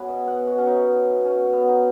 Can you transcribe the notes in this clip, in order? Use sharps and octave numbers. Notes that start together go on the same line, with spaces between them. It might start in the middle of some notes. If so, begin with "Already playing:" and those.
Already playing: B3 C#4 F#4 G#4 B4 C#5
B2 D#5
B2 F#5
B2 F#4
C#4
B2 D#4
B2
B2
B2 C#4
B2
B3
B3 D#4